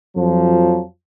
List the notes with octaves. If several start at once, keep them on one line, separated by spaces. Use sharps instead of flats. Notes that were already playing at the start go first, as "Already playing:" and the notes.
F2 F3 F#3